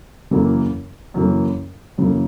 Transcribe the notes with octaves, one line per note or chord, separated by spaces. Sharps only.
F#2 C#3 E3 A#3
F#2 C#3 E3 A#3
F#2 C#3 E3 A#3